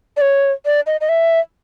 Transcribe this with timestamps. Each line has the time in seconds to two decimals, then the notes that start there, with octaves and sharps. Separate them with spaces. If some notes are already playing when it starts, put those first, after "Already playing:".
0.17 D5
0.21 C#5
0.66 D5
0.87 D#5
1.01 D#5
1.09 E5